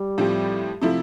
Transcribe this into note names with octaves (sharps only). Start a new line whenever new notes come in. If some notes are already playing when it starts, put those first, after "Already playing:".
Already playing: G3
A2 F3 C4 G4
C3 F3 A3 E4